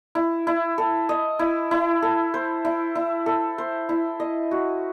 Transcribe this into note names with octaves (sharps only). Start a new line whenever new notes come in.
E4
E4
A4
D#5
E4
E4
A4
C5
E4
E4
A4
C5
E4
D#5
F#4